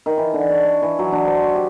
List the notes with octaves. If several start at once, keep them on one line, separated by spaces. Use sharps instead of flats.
D#3
E3
D3
C#5
C#5
E3
F#3
D4
C5
C#6
G4